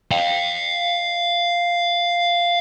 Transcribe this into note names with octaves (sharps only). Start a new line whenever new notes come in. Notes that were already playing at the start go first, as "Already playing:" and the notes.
F5 G5